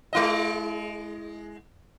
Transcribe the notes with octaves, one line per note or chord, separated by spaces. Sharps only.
G#3 E4 D#5